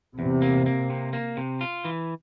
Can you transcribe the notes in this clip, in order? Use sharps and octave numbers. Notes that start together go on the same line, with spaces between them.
E2 C3
A#3
A#3
C3
A#3
C3
F4
E3